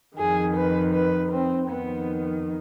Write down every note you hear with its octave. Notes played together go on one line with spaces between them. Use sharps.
F2 D#3 G#4
B4
B4
C4
F2 D#3 B3